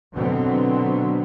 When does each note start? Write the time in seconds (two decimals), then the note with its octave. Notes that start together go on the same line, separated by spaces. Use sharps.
0.15 B2 D3 F#3 B3 C4